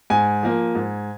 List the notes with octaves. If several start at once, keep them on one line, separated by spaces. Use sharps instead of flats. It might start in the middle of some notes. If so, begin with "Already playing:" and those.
G#2 G#5
F3 A#3
G#2